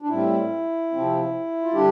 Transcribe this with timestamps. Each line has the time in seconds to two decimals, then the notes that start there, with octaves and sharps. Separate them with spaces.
0.02 D4
0.09 A2 G3 C4 E4
0.92 C3 F3 C4
1.62 F4
1.73 D3 G3 D4 G4